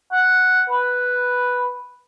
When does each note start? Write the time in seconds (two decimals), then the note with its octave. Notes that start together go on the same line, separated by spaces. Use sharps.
0.12 F#5
0.70 B4